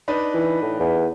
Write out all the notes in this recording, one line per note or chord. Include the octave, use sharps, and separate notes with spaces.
D4 D#4 B4
E3
A2
E2